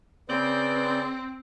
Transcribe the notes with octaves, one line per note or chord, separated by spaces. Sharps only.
C#3 C4 B4 D5 G6